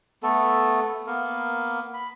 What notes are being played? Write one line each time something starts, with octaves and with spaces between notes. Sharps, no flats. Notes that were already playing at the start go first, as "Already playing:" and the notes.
A3 B3 A4
A#3 B3 A#4
B5